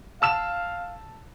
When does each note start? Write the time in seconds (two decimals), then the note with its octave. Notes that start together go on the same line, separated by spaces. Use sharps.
0.22 F5 A5 E6 E7